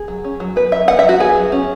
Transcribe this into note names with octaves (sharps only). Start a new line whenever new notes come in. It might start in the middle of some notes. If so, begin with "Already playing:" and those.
Already playing: G#4
F#3
C#4
F#3
B3 B4
F#3 E5
B3 F#5
E5
F#3 F#4
B3 G#4
F#3
C#4